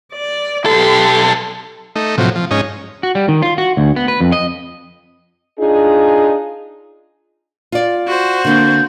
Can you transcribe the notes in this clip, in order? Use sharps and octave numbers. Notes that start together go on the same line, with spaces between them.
D5
B1 G4 A4 C6
A3 D#4
A2 C3 F3 F#3
F3
G#2 C#4 D#4
F#4
G3
D#3
F4
F#4
D2
B3
B4
F2
D#5
D4 D#4 F4 G#4
F4 D5
F#4 C5
D3 A#3 C4 G6